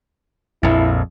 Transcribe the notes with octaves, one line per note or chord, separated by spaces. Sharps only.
A#1 F2 E4